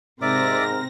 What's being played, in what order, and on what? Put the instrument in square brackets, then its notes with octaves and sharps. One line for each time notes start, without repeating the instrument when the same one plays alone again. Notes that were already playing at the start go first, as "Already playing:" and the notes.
[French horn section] G#2 [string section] C3 C4 A#6 [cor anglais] A#4 [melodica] D5 E5 D6